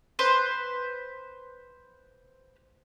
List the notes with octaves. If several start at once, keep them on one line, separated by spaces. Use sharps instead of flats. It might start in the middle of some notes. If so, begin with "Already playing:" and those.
B4 C5 C6